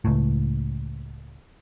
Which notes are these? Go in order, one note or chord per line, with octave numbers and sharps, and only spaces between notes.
C#2 A2